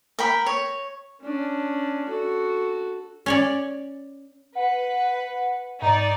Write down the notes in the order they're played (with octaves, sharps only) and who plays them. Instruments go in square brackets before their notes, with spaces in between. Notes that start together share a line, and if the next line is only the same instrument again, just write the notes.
[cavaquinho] A#4 G5 B5
C#5
[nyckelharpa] C#4 D4
F#4 A4
[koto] C#4 C#5 D5
[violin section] B4 [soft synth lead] F#5
[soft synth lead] F#5
[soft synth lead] G#2 [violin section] D#4 D5